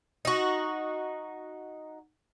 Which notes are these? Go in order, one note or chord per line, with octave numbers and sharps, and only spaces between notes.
D#4 F#4